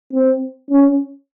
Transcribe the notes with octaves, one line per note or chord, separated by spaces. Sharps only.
C4
C#4